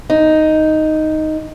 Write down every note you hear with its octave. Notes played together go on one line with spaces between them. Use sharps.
D#4